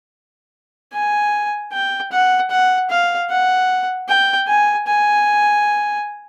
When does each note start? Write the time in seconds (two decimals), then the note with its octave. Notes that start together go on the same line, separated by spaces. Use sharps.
0.93 G#5
1.73 G5
2.12 F#5
2.51 F#5
2.90 F5
3.30 F#5
4.08 G5
4.48 G#5
4.87 G#5